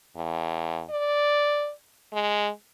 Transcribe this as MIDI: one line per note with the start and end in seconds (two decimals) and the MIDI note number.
0.17 0.84 40
0.91 1.72 74
2.14 2.49 56